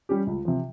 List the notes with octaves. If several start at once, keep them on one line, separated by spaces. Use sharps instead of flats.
G3 C#4 G4
C#2
C3 F3